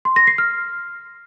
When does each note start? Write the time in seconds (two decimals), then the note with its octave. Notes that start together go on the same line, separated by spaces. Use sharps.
0.05 C6
0.16 A#6
0.27 C7
0.38 F6